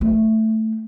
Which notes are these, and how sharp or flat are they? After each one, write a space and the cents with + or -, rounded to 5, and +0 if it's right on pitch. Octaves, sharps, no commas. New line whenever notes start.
A3 +5